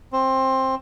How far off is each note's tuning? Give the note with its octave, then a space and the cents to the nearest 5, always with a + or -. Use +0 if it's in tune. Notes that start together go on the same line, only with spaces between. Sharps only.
C4 +15